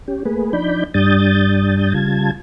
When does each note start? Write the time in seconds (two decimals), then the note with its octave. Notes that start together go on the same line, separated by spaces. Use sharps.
0.08 C#4 G4
0.25 A3 A#3 G#4 B4
0.53 F3 D4 D#4 D5 B5 G6
0.94 G2 G3 D4 D#6 G6 A6
1.94 C#3 G3 F4 A5 G#6